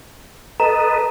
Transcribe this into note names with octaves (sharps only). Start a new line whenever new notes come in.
A4 B4 D#5 A#5